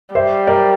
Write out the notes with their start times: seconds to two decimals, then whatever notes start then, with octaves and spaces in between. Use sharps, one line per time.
0.15 G3 C5 E5
0.47 A#4 D5